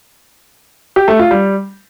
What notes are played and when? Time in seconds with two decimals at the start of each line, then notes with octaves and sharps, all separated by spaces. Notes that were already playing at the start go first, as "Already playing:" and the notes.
0.96 G4
1.08 A3
1.19 F4
1.31 G3